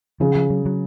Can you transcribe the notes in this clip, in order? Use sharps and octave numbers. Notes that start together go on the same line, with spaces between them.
C#3 F3
F3
F#3
F#3